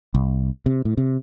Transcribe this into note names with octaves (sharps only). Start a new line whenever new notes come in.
C2
C3
A2
C3